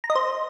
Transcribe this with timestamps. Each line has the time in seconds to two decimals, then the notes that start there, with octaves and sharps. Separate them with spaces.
0.04 A#5
0.10 D#5
0.15 C5